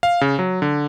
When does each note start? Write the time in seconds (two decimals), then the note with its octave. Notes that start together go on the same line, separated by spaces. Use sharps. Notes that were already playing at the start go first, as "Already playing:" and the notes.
0.03 F5
0.21 C#3
0.39 F#3
0.62 D3